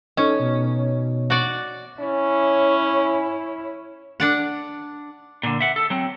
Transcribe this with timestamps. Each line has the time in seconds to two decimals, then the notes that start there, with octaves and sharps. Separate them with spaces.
0.17 C#4 D#4 A4 C#5 D#5
0.40 B2
1.30 F#4 D5
2.00 C#4 E4 C#5
4.20 D4 D5 F#5
5.43 A#2 D3
5.60 E5 F#5
5.76 A4
5.90 F#3 C4